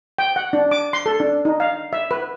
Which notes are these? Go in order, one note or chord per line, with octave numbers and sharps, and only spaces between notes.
G5
F#5
D4
D6
C6
A4
D4
D#4
F5
E5
B4